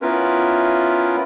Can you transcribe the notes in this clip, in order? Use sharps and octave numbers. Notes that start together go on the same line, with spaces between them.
B3 C#4 E4 F4 A#4 B4